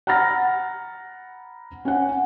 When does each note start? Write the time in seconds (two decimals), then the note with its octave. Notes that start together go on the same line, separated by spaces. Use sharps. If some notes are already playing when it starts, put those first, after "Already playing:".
0.07 F#5 A#5 B5 F6 A6 A#6
1.85 C#4 F#5